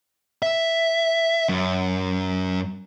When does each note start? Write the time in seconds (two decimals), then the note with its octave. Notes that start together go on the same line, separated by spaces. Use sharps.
0.42 E5
1.49 F#2